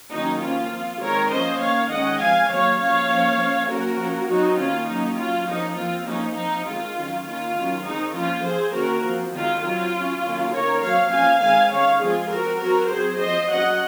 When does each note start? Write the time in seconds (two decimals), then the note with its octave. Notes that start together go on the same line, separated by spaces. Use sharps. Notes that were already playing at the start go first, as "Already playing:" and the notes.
0.11 D#3 F#3 A#3 C#4 D#4
0.40 F3 A#3 C#4 F4
0.71 F3 C4
1.00 D#3 G#3 C4 A#4 C#5
1.30 F3 A#3 C#4 C5 D#5
1.59 D#3 A#3 C#4 C#5 F5
1.89 D#3 G#3 C#4 D#5 F#5
2.19 F3 C4 F5 G#5
2.49 D#3 F#3 A#3 C#5 F5
2.78 F3 A#3 C#4 C#5 F5
3.08 F3 A#3 C#4
3.38 F3 A#3 C#4
3.67 F#3 A#3 C#4 F#4 A#4
3.98 F3 A#3 C#4
4.27 F#3 C4 D#4 F#4
4.57 D#3 A#3 C#4 F4
4.87 D#3 F#3 A#3 C#4 D#4
5.17 F#3 C#4 F4
5.47 F3 A#3 C#4 D#4
5.76 F3 C4 F4
6.05 F3 A#3 C#4 D#4
6.35 F3 C4 D#4
6.65 D#3 G#3 C4 F4
6.95 D#3 F#3 C#4
7.25 D#3 A#3 C#4 F4
7.54 D#3 F#3 C#4
7.84 D#3 G#3 C4 D#4
8.14 F3 A#3 C#4 F4
8.43 F3 C4 G#4 C5
8.73 D#3 A#3 C#4 F#4 A#4
9.03 F3 C4
9.33 D#3 G#3 C4 F4
9.62 F#3 C4 F4
9.92 F#3 C#4
10.22 D#3 F#3 A#3 C#4
10.52 D#3 A#3 C#4 A#4 C#5
10.81 F#3 C4 C#5 F5
11.11 F3 A#3 C#4 F5 G#5
11.40 D#3 G#3 C4 F5 G#5
11.70 D#3 G#3 C#4 C#5 F5
12.00 F3 G#3 C4 F4 G#4
12.30 F3 C4 F#4 A#4
12.59 F#3 C4 F#4 A#4
12.89 F#3 C4 G#4 C5
13.19 F3 C4 C5 D#5
13.49 F#3 C#4 D#5 F#5